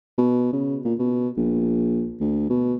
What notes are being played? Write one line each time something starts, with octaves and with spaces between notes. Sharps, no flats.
B2
C#3
A#2
B2
A#1
D2
B2